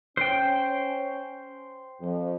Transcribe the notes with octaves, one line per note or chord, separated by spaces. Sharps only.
C#4 C5 G5
F2 F3